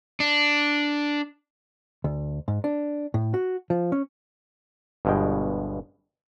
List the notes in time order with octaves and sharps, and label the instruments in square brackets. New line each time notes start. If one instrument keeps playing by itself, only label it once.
[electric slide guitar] D4
[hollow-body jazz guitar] D2
G#2
D4
A2
F#4
F3
C#4
[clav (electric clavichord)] G1 G2 B2 G#3 G5